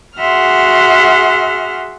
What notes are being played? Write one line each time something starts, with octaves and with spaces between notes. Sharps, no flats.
F#4 G#4 E5 F#5 C6 F6